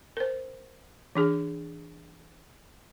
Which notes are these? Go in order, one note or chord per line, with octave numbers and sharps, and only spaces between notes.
A#4 C5
E3 D4 G#4